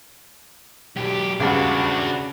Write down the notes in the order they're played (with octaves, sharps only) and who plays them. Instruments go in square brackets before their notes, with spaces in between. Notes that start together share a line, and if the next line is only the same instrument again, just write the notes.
[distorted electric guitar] B1 G4
[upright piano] G#1 E2 G2 [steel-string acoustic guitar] C#3 [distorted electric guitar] D4 F#4